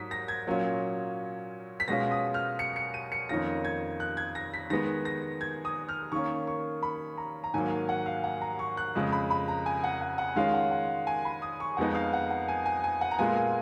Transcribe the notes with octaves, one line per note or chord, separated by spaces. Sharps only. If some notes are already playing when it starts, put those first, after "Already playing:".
Already playing: G#2 F#3 D#6 B6
A#6
G#6
A#2 F#3 C#4 F4
B6
B2 G#3 C#4 F4 A#6
D#6
F6
C#7
C#7
D#7
C#7
F2 D#3 A#3 C#4 F4 A#6
G#6
F#6
G#6
A#6
B6
D#3 G#3 B3 A#6
A#6
G#6
D#6
F6
D#3 A#3 C#4 C#6
C#6
B5
A#5
A#5
G#2 D#3 F#3 A#3 G#5
F5
F#5
F5
F#5
A#5
C#6
F#6
F2 C#3 G#3
B5
B5
A#5
G#5
F#5
F#5
F#5
D#3 G#3 C#4 F4 F5
F#5
F#5
G#5
B5
D#6
C#6
F2 F3 G#3 B3 D#4 F#5
F5
F#5
F#5
G#5
G#5
G#5
F#5
A#5
A#2 G#3 B3 F4 G#5
G#5